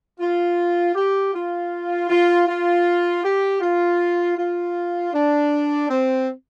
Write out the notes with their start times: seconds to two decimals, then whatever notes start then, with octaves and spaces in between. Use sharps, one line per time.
0.20 F4
0.95 G4
1.34 F4
2.09 F4
2.48 F4
3.24 G4
3.61 F4
4.37 F4
5.14 D4
5.89 C4